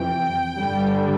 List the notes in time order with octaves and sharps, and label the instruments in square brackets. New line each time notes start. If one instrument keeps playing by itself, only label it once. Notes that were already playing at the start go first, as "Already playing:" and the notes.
Already playing: [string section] F2 C3 E3 G5
G2 D3 G3